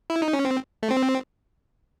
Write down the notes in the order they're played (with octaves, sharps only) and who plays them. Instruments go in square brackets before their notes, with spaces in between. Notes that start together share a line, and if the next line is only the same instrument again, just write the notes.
[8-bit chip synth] E4
D#4
C#4
C4
A3
C4